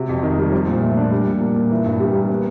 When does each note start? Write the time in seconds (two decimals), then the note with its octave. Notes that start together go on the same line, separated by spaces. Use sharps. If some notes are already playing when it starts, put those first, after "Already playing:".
Already playing: C3 F#4
0.09 F2
0.23 D#3
0.38 G3
0.52 F3
0.68 A#2
0.82 A3
0.97 D4
1.11 G3
1.27 A#2
1.41 A#3
1.56 A#2
1.71 E3
1.85 G2
2.00 G3
2.14 A#3
2.29 B3